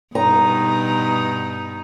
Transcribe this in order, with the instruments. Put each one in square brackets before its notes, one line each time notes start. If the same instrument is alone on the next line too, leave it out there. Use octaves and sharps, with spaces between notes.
[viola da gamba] G2 B2 D#4 [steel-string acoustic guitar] A#5